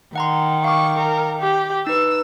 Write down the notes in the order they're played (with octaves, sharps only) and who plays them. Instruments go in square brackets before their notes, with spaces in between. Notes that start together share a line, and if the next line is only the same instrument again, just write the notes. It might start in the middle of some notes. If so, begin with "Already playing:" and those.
[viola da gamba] D#3 [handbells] F#5 A#5 C6
[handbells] F5 D6 [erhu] C#6
[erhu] A#4
G4
[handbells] D#4 B4 [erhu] E6